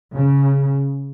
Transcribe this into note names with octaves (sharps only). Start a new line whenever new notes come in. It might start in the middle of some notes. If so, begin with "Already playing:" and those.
C#3